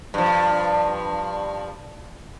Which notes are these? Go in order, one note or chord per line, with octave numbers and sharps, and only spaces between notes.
G2 F3